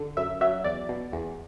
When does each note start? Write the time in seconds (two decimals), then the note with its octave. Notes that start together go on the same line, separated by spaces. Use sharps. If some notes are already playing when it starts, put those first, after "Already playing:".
Already playing: D3
0.17 F#2 E5
0.41 F#3 E5
0.64 E2 D5
0.89 B2
1.12 E2